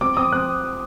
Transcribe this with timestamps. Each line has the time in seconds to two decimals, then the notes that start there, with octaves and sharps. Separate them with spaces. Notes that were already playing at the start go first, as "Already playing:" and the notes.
0.01 C4 D6
0.17 C4 D#6
0.32 C4 F#6